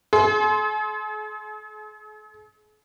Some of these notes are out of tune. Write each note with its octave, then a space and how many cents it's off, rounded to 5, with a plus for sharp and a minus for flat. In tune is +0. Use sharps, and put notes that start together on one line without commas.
G#4 +45 C6 +0